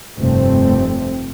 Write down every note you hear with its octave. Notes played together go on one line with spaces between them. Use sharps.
F1 G2 A3 C4